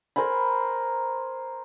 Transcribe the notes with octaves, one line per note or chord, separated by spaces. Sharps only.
A#4 C5 G#5 B5